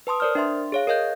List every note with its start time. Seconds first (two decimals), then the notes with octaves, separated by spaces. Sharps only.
0.07 B4 A5 C6 D#6
0.20 A#4 C5 D5 D#6 F6
0.35 D4 E5 C6
0.72 G#4 C#5 F5
0.87 A#4 C#5 D#5 F5 G6